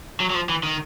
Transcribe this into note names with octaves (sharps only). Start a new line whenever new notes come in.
F#3
F#3
F3
E3
D#3